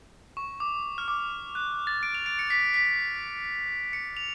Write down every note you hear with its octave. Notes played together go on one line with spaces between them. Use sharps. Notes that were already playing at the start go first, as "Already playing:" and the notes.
C#6
D6
F6
D6
F#6
A6
D7
F7
D7
C#7
B6
B6
C#7
F7